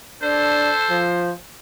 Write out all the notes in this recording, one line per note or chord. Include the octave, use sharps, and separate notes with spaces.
D4 A4 C5
F3